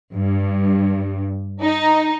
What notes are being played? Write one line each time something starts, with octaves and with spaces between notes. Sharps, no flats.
G2
D#4